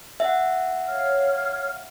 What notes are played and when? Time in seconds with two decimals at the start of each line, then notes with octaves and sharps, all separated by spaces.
0.20 E5 F#5
0.87 C#5 F5 F6